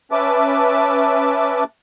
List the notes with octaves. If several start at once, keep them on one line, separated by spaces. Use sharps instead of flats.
C#4 B4 E5 A5 D6